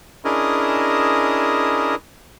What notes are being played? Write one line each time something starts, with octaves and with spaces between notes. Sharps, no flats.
C#4 D4 E4 G#4 A#4 D#5